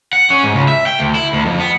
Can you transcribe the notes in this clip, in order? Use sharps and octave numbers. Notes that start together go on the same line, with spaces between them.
F#5
C#4
G#2
C#2
E5
G5
D2
E4
D2
F2
B3